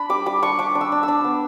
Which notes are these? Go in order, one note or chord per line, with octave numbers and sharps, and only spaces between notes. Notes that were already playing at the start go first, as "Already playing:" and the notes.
Already playing: D4 B5
G3 D6
G3 D6
D4 C#6
D4 D6
D4
E6
D4
E6
D4
B3